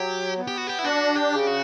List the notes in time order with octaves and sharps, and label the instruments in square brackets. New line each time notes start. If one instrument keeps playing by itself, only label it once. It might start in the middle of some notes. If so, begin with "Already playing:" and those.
Already playing: [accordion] F#3 [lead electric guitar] G4
[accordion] B3
[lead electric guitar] G4
F#4
G4
E4
[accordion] D4 [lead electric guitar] F#4
[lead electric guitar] G4
[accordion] C#3
[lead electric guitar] F#4